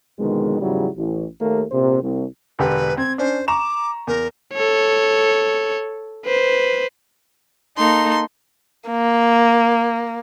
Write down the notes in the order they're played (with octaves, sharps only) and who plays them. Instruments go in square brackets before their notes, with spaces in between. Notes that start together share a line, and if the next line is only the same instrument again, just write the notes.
[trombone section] F2 B2 D3 D#3 G#3
E2 G#2 C#3 F#3 G3 E4
A1
D#2 A3 A#3
A#1 C3 C5
C2
[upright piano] E1 D3 G4 [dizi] B4
[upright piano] C4 [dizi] G#6
[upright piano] C#4 D4 [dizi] C5
[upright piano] A#5 C#6 E7 [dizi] D6
[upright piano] E2 [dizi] A#4
[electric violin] A4 C#5
B4 C5
[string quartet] A#3 D#4 A4 [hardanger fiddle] C6
[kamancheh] A#3